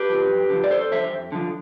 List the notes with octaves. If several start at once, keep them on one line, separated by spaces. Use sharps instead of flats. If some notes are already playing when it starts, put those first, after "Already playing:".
Already playing: G4 B4
D3 F3
F2
D3 F3
D5
F2 A4 C5
D3 F3 C5 E5
F2
D3 F3